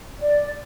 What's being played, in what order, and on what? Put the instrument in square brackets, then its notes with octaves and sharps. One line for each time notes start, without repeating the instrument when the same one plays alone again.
[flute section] D5